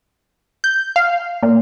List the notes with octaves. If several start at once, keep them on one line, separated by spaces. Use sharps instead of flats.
G6
F5
A#2